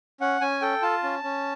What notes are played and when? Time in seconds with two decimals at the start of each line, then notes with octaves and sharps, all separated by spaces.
0.20 C#4 F#5
0.41 C#4 G#5
0.61 A4 G5
0.82 F4 A5
1.03 C#4
1.23 C#4